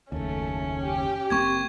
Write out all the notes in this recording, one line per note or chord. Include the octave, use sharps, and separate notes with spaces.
F#1 D#2 A3 C#4
G4
F#1 A#3 C4 C#6 D6 G#6